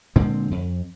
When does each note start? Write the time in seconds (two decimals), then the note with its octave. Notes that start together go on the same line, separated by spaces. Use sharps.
0.16 A#2 D3 G#3 C4
0.51 F2